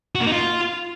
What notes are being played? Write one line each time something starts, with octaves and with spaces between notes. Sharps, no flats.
F#4
A#3
D#4
F4